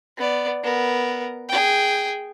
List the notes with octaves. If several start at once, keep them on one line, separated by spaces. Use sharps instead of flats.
B3 D5
B3 A#4
G#4 G5